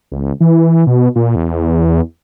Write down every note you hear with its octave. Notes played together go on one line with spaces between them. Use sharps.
C#2
E3
B2
A#2
E2